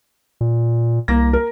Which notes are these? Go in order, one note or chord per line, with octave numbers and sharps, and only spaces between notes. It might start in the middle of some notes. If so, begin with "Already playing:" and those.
A#2
C2 A#3 A#6
A#4